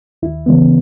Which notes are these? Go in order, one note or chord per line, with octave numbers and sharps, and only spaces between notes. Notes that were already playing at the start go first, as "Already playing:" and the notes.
D#2 E4
C#3 E3 G#3 B3